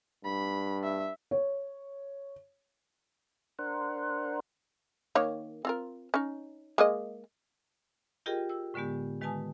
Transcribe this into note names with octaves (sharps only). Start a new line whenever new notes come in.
G2 B5
E5
C#5
D4 A#4 C5 F#5
D#3 A#3 C#5
C4 F4 A#4
C#4 D#4
G#3 A#3 D#5
F4 G4 G#4 A#4 D#5 G5
E6
A2 D3 G#3 B3 G4
D#3 G#3 B4 G#5 A5 D#6